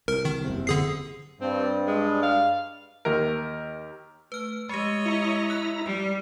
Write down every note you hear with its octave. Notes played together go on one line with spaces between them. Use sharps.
C2 A#4
D#3
F#1 E2 C3
D3 G#4 C7
G2 C4
G#3
F5
D#2 A#4
A3 B4 F6
G#3 G4 C#5 D#5
E4 A#5
F#6
G3